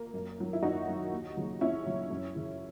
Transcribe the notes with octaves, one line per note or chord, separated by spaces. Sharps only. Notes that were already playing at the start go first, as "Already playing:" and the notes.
Already playing: A#3
F#2
D#3 F#3
E4
F#2 D#4 F#4
D#3 F#3
D#2
C#3 F#3
D#2 C#4 E4
C#3 F#3
F#2
C#3 E3